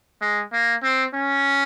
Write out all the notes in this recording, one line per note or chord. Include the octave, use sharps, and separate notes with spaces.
G#3
A#3
C4
C#4